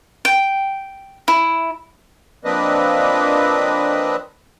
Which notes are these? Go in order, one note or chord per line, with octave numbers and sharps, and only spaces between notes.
G5
E4
F3 A#3 C4 D4 B4 D#5